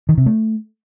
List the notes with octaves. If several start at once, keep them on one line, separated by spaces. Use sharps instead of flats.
D#3
C3
A3